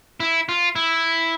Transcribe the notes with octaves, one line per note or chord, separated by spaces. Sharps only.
E4
F4
E4